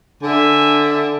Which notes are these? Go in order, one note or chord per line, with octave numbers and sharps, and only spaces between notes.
D3 E5 G#5